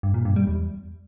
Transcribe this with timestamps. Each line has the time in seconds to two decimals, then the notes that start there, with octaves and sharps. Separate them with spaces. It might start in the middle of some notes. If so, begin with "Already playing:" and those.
0.03 G2
0.14 A#2
0.25 G2
0.36 G3
0.47 E2